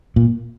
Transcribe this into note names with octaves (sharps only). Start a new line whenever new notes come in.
A#2